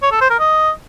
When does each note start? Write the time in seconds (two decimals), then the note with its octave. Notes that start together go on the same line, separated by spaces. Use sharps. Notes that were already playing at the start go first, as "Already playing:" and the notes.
0.02 C#5
0.12 A4
0.21 C5
0.30 A#4
0.40 D#5